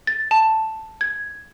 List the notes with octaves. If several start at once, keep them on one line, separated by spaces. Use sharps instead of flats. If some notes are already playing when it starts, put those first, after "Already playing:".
A6
A5
G#6